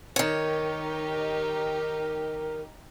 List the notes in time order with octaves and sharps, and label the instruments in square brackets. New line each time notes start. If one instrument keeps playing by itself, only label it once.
[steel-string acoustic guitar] D#3 C#5 [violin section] D#4 G4 [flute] A#4